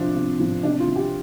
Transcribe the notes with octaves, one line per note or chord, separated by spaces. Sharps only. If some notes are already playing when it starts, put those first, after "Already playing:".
Already playing: C3 F3 D4
C3
F3
C3 D4
F4
F3
G4